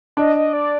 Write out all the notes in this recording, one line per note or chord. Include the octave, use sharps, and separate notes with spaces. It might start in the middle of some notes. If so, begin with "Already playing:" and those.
D4 D#5
D#5
D5